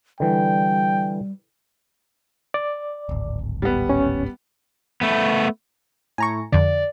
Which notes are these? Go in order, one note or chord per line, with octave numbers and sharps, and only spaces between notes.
D3 E3 G3 G5
D5
D1 G#1
G3 B3
C#4
A3 B3
A2 G#5 A#5 C#6
F2 D3 D5